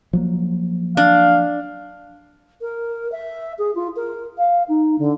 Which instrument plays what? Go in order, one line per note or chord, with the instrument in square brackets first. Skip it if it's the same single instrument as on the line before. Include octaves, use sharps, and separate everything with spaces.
[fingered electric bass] F3 F#3 A#3
[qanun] D4 [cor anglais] F5
[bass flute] A#4
E5
G#4
F4
A#4
F5
D#4
D3